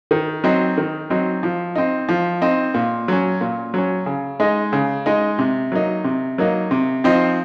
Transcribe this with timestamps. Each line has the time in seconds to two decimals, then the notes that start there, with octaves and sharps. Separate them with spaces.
0.11 D#3
0.44 F#3 C4 D#4
0.78 D#3
1.10 F#3 C4 D#4
1.43 F3
1.75 C4 D#4
2.09 F3
2.42 C4 D#4
2.74 A#2
3.08 F#3 C#4
3.41 A#2
3.74 F#3 C#4
4.06 C#3
4.40 G#3 D#4
4.73 C#3
5.06 G#3 D#4
5.39 C3
5.72 F#3 A#3 D#4
6.04 C3
6.38 F#3 A#3 D#4
6.71 C3
7.04 F3 C4 D#4